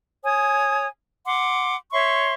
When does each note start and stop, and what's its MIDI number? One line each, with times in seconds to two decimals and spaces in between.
0.24 0.88 73
0.24 0.88 80
0.24 0.88 87
1.26 1.76 78
1.26 1.76 84
1.26 1.76 86
1.92 2.34 73
1.92 2.34 76
1.92 2.34 84
1.92 2.34 85